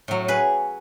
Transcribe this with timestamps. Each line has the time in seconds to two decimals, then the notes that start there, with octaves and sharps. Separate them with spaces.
0.08 A2 F#3
0.28 G#4 B4